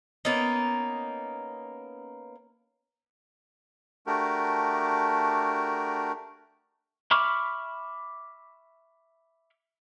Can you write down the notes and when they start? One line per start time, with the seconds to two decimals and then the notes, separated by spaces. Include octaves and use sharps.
0.25 A#3 B3 C#4 D#4
4.07 A3 D4 F#4 G4 A#4
7.11 E5 B5 C#6 D6 F6